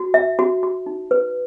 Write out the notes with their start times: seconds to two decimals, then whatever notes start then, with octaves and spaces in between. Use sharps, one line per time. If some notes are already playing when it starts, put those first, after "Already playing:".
Already playing: F#4
0.14 E5
0.39 F#4
0.63 F#4
0.86 D#4
1.11 B4